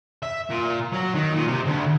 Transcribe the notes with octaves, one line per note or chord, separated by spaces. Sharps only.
E5
A#2
F#3
D#3
A#2
C3
D2